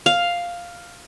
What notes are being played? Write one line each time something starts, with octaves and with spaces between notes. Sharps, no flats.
F5